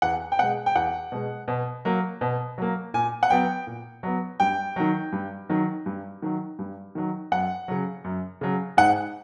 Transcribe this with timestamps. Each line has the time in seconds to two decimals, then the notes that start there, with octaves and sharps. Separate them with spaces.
0.02 E2 F#5
0.32 G5
0.39 B2 G#3 F#5
0.66 G5
0.75 E2 F#5
1.12 B2 G#3
1.48 B2
1.85 F#3 A#3
2.21 B2
2.58 F#3 A#3
2.94 A#2 G#5
3.23 F#5
3.30 F#3 B3 G5
3.67 A#2
4.03 F#3 B3
4.40 G2 G5
4.76 D#3 F#3
5.12 G2
5.49 D#3 F#3
5.86 G2
6.22 D#3 F#3
6.59 G2
6.95 D#3 F#3
7.31 F#2 F#5
7.68 C#3 F#3
8.04 F#2
8.41 C#3 F#3
8.77 G#2 F#5